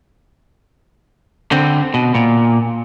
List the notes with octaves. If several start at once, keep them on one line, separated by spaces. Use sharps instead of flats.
D3 C4
B2
A#2